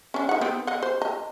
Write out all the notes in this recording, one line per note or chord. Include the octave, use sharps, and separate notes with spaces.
C#4 D4
D#4 F#5
B3 C4
D#5 F#5
C5
D#5 A#5